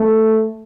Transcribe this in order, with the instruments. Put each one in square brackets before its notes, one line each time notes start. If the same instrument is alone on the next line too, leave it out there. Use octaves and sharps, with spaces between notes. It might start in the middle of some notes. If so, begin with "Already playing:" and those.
Already playing: [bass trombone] A3